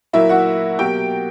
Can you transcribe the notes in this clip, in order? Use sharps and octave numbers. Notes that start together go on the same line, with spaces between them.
A#2 F#3 A#3 E4 E5
F#4 F#5
B2 F#3 A#3 G4 G5